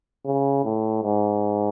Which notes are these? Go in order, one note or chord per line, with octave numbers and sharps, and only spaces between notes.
C#3
A2
G#2